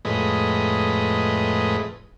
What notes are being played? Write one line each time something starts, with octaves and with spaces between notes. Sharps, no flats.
F2 A2 G#3 B4 D#5